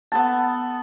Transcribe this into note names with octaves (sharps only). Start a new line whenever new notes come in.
B3 A4 A5